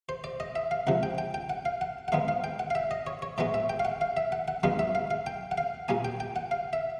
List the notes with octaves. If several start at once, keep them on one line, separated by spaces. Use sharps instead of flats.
C5
D5
D#5
E5
F5
C#2 C3 F3 F#5
G5
G5
G5
F#5
F5
F#5
F#5
G#2 D#3 G#3 B3 F5
F5
G5
F#5
F5
E5
D#5
C#5
C#5
A2 E3 G#3 B3 D5
E5
G5
F5
F#5
F5
E5
F#5
F#5
F#2 D#3 G#3 B3 F5
E5
F5
F5
G5
F#5
F5
A#2 G3 A#3 G#5
G5
G5
F#5
F5
E5